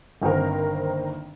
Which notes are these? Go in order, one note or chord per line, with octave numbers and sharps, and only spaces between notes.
G1 D#3 A#3 C4 A#4